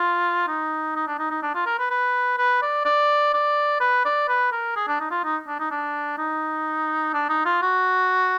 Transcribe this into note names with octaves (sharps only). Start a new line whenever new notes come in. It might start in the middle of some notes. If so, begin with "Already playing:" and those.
Already playing: F4
D#4
D#4
D4
D#4
D#4
D4
F4
A#4
B4
B4
B4
D5
D5
D5
B4
D5
B4
A#4
G#4
D4
D#4
F4
D#4
D4
D#4
D4
D#4
D4
D#4
F4
F#4